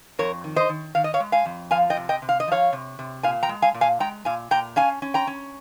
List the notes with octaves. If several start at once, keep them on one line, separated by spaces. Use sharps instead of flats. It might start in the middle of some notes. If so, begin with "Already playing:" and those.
F2 A#4 C#5
D#3
C5 D#5
D#3
D#3 F5
D#5
C#5 F5
G#3
F5 G#5
F2
F3 F5 G#5
D#5 G5
C3
D#5 G5
C3
F5
D#5
F3 C#5 F5
C3
C3
A#2 F5 G#5
G5 A#5
G#3
F5 G#5
A#2
F5 G#5
G#3 G5 A#5
A#2 F5 G#5
A#2 G5 A#5
C#4 F5 G#5
C#4
G5 A#5
C#4